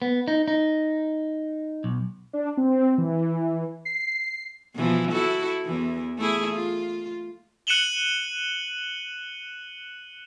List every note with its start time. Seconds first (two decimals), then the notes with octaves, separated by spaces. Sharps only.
0.02 B3
0.28 D#4
0.48 D#4
1.84 B1
2.33 D4
2.57 C4
2.98 E3
3.85 C7
4.75 B2 E3 F3
5.12 E4 F#4 A4
5.65 E2 E3
6.18 A3 E4 G#4
6.56 F4
7.67 F#6 C#7 D#7 E7 F#7 G7